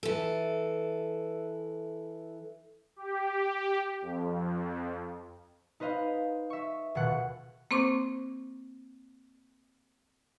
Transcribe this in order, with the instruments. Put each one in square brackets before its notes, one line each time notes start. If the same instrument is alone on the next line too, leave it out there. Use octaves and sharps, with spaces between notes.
[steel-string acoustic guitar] E3 A4
[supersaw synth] G4
F2
[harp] D#4 B4 C5 D#5 F5
E5 C#6
D#1 B2 F#5
[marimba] A#3 C4 C5 C#6 D6